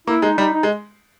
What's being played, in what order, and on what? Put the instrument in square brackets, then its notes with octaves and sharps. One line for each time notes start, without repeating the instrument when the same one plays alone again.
[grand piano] A#3 [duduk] E4
[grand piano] G#3 [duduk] D#4
[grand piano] G3 [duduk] D#4
[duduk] D#4
[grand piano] G#3